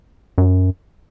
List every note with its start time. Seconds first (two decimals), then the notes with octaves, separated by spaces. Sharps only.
0.38 F#2